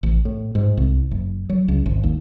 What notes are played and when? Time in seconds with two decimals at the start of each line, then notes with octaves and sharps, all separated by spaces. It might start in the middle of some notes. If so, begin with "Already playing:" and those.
0.03 A1
0.25 A2
0.55 G#2
0.77 C2
1.11 F#1
1.50 F#3
1.68 C#2
1.86 G#1
2.03 D#2